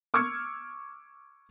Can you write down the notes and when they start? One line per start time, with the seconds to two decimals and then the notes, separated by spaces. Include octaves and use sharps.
0.14 C#6 D6 E6 F6 G#6 C#7